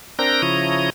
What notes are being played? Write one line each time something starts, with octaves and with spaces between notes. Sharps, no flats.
C4 D4 A#4 A#5 G6 A#6
C#3 F3 E4 C#5 A#5 D#6